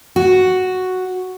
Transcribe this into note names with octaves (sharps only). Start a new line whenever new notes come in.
F#4